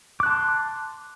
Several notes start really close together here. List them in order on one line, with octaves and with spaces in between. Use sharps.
D6 F#6 A5 C6